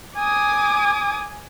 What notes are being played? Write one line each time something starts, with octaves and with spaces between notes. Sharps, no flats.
G#5 D6 D#6